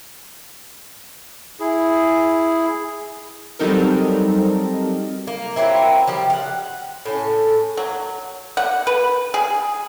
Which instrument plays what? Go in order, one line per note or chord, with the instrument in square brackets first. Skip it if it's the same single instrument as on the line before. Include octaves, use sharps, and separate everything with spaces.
[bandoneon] E4 G#4
[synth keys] F#3 G3 C4 D#4 A4 A#4
[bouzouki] A#3
F#3 A#3 C4 E4
F3 G3 G4
F5 F#5
A2 C#4
[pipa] F#3
F#5
B4
G#4